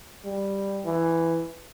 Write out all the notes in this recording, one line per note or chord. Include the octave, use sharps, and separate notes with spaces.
G3
E3